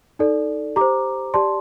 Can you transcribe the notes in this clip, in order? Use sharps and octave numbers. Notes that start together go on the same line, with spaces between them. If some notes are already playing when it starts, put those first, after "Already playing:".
D#4 A4 D5
G4 C5 A#5 D6
G4 D5 A5 C6